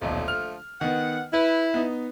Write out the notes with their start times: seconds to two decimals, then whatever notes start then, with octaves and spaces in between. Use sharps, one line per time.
0.02 D#1 B1 D3 F3 A3
0.28 F6
0.81 D#3 B3 F#5
1.34 E4 B4
1.74 B3 D#4